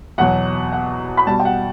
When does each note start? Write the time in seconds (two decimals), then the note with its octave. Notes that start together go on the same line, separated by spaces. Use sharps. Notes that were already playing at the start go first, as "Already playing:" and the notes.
0.18 E2 B2 F#3 F#5
0.72 F#5
1.17 B5
1.27 B2 G3 A5
1.39 G5
1.45 F#5